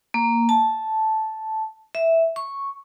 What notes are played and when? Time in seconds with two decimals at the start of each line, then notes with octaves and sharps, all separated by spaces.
0.14 A#3
0.49 A5
1.95 E5
2.36 C#6